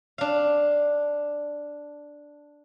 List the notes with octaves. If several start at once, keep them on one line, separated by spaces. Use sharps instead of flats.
D4 F5